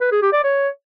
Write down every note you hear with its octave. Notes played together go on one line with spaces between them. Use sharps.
B4
G#4
G4
D5
C#5